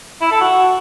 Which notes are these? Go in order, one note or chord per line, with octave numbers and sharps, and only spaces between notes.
E4
A4
F#4